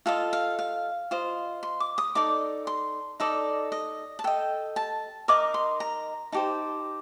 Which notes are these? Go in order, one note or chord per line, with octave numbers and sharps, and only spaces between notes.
F4 A4 D#5 F5
F5
F5
F4 C5 D#5
C6
D6
D#6
D#4 A4 D5 D6
C6
D#4 A4 D5 D#5
D#5
A5
A4 D#5 G5
A5
D#4 A#4 D#5 D6
C6
A#5
D#4 G4 C5 A5